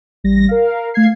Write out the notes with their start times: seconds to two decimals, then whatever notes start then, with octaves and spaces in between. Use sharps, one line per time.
0.24 A1 G3 A#6
0.49 A#4 F5
0.94 A3 F5 G#6 C7